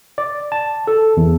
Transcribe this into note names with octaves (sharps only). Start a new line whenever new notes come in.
D5
A5
A4
E2